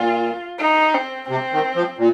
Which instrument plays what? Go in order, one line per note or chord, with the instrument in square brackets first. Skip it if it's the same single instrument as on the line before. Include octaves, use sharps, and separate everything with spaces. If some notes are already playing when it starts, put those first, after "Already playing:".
Already playing: [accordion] A#2 [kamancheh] F4
[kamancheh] D#4
C4
[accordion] C3 [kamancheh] C4
[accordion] D#3
F3
A#2